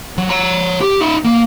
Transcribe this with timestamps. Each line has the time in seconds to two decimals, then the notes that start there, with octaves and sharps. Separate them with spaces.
0.18 F#3
0.30 C#5 A#5
0.81 G4
1.01 D#4 E5
1.24 A#3